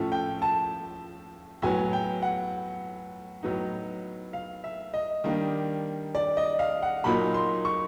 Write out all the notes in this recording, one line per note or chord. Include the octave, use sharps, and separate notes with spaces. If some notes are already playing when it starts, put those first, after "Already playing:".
Already playing: A2 F3 A3 C#4
G5
A5
A2 F#3 B3 G#5
G5
F#5
A2 F#3 B3 D#4
F5
E5
D#5
D#3 G3 A#3 D4
D5
D#5
F5
F#5
A#2 F#3 A#3 D#4 B5
C6
C#6